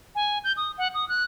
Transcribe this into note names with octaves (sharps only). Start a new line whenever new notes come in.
G#5
G6
D#6
F#5
D#6
F#6